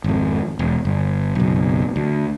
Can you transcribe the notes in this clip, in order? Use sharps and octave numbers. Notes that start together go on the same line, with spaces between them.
G#1 F2
E1
G1
F#1 B1
D2